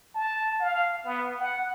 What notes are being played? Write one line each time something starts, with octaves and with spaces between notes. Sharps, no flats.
A5
F5
B3
F#5